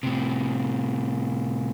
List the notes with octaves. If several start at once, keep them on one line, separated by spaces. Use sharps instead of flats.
A2 C3